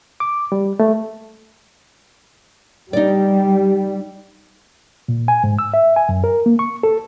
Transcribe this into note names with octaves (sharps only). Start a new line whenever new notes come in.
D6
G3
A3
G3 D#4 D5
A#2
G#5
G#2
E6
E5
G#5
F#2
A#4
A#3
C#6
A4